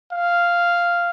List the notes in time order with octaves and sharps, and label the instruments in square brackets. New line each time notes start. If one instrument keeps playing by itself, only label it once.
[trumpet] F5